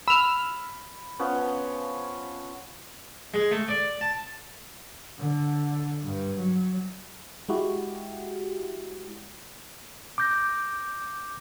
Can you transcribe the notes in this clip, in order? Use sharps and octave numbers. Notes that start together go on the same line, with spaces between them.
B5 E6 F6
F3 B3 C#4
G#3
A3
D5
A5
D3
G2
F#3
G#3 E4 F#4 G4
D6 G6 A#6